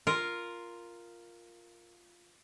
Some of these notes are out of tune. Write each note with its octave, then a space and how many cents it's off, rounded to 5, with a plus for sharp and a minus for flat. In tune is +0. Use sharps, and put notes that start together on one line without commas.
F4 +0 A#4 +0